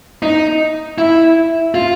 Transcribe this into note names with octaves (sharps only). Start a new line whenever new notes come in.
D#4
E4
F4